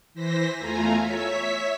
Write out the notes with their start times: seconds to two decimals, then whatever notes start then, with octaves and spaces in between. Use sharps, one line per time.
0.14 E3 C5 A#6 B6
0.57 E2 A3 F4 G#5 A#5
1.00 C#5 E5 B6